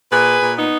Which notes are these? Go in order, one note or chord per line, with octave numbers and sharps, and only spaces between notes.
A#2 G#4 B4
A#2
B3 D#4